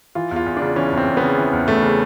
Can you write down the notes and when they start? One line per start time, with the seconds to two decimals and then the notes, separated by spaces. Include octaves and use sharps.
0.15 E3 F4
0.31 E2
0.36 F4
0.46 E2
0.57 D4
0.62 C#3
0.76 E3 C#4
0.92 E2
0.97 C4
1.07 E2
1.17 C#3 B3
1.38 E3
1.53 E2
1.68 E2 A3
1.83 C#3